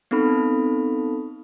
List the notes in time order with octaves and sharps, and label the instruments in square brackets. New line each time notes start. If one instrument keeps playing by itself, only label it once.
[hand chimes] B3 C4 D#4 A4 B5